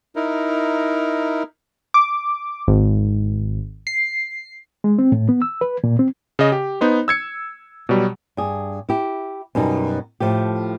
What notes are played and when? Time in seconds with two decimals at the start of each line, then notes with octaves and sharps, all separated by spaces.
0.16 D#4 E4 A#4
1.94 D6
2.68 G#1
3.87 C7
4.84 G#3
4.99 C4
5.12 A2
5.29 B3
5.42 E6
5.61 B4
5.84 A#2
5.99 C4
6.39 C#3 D#5
6.52 G4
6.81 B3 D#4 C5
7.08 E6 G#6 C#7
7.89 B2 F#3 G3
8.37 G2 G#4
8.89 E4 G4
9.55 F#2 B2 G3 D#4
10.20 A2 F3 A3 G4